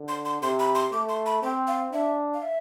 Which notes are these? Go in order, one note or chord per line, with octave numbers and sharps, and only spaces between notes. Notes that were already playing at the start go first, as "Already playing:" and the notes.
Already playing: D3
C6
C6
C3 C6
B5
C6
A3 D6
C6
B5
C4 G5
F5
D4 E5
F5
E5